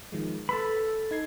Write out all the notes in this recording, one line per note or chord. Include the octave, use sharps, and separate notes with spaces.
D#3 F3 G#3
A4 B4 B5 E6
D#4 G#6 C7